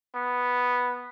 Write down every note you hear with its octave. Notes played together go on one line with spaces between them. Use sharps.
B3